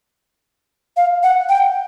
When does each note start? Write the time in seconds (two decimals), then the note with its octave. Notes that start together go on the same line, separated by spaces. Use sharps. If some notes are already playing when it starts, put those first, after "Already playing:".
0.97 F5
1.23 F#5
1.49 G5